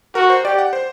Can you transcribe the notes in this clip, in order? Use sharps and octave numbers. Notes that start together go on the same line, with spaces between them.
F#4 A#4
C5
G4 D5
F#5
C5